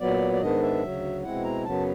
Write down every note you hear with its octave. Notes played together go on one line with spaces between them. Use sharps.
A#2 F#3 B3 D5
D5
G#2 D#3 G#3 B3 D4 D#5
E5
D2 C#3 F#3
B2 G#3 C4 E4 F#5
A#5
F#2 C#3 F#3 B3 A5